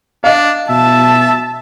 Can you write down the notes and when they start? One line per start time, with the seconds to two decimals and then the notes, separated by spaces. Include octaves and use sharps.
0.24 D4 D#5 F5
0.69 B2 E5 A5